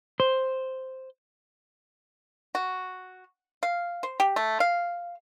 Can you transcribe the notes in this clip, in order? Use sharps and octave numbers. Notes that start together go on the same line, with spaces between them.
C5
F#4
F5
C5
G4
A3
F5